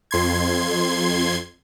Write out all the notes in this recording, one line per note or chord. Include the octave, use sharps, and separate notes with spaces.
F2 C6 G#6